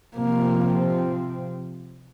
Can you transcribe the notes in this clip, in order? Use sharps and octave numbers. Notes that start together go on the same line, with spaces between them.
C3 F3 A#3 C4